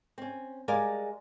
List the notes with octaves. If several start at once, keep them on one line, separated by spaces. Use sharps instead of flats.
C4 C#4
G3 G#3 A#4 D5 F5 G#5